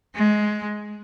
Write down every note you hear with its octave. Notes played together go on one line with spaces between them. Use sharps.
G#3